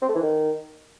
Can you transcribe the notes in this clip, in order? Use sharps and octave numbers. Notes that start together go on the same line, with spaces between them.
C4
A3
E3
D#3